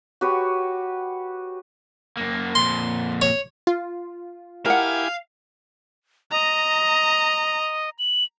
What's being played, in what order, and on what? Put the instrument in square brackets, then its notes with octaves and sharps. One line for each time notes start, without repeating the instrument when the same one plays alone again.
[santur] F#4 G4 B4 C#5
[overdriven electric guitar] F#2 A#3
[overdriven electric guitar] F2 A#2 [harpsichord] C6
[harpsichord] C#5
[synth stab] F4
[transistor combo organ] E4 G4 G#5 [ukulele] A#4 F#5 [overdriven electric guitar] F5
[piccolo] D#5 [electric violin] A#5
[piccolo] F#7